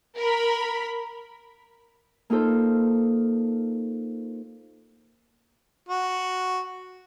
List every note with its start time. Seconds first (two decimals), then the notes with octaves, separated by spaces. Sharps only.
0.19 A#4 B5
2.30 A#3 D#4 F4 A4 C5
5.89 F#4